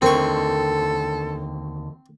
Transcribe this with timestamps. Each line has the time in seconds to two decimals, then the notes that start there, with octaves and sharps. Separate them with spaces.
0.02 D#2 D3 C4 A4 A#4 C#6